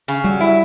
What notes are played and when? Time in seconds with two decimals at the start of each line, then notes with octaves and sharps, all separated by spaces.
0.08 C#3
0.24 F#3 G3
0.41 E4